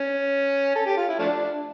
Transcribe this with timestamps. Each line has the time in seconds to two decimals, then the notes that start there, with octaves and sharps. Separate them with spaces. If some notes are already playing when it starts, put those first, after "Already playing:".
Already playing: C#4
0.75 A4
0.86 G4
0.97 F4
1.08 E4
1.19 F3 A3 D4